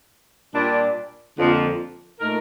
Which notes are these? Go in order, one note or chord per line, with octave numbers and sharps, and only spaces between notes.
A#2 G3 D4
F2 D3 F3 A#3
A#2 A3 D#4 A#4